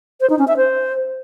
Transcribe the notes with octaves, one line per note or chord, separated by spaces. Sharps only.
C5
D#4
C#4
E5
C5